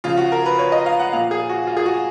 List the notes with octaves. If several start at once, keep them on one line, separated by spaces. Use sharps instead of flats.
C#3 F3 F4
F#4
A#4
B4
C#5
D#5
F5
F#5
A#2 F3 F5
G#4
F#4
F4
G#4
F#4